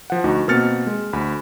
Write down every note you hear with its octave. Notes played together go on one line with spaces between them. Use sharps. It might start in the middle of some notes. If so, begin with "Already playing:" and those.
F3 F#5
D2 D#4 F#4
B2 A#3 C4 F6 A6 C#7
G#3
D2 B5